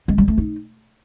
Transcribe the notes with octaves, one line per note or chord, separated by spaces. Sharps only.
G#3
G3
A3
D#4